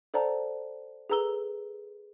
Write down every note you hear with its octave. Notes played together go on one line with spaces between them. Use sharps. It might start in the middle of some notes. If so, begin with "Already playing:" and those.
A4 C5 D5 F#5 A5 A#5
G#4 A4 B4 A#5 E6 G7